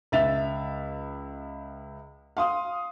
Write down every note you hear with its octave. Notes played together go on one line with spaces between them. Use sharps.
C#2 E5 A6 F7
F5 C6 D#6